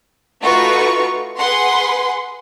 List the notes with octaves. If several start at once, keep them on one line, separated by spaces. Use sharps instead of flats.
A3 D#4 F4 F#4 B4 C#6
G#4 B4 F#5 C6